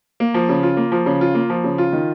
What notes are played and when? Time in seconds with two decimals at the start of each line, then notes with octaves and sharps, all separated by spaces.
0.20 A#3
0.34 F3
0.49 C#3
0.63 F4
0.77 A#3
0.92 F3
1.06 C#3
1.21 F4
1.35 A#3
1.50 F3
1.64 C#3
1.78 F4
1.93 D#3